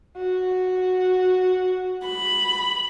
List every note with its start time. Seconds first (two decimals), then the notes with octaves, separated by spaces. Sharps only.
0.17 F#4
2.06 B5